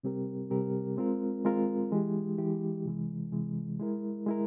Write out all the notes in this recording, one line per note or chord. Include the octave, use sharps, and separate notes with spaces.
C3 G3 C4 G4 A#4
C3 G3 C4 G4 A#4
G#3 C4 F4 A#4
G#3 C4 F4 A#4
E3 G#3 E4 G4
E3 G#3 E4 G4
C3 E3 G#3
C3 E3 G#3
G#3 E4 A#4
G#3 E4 A#4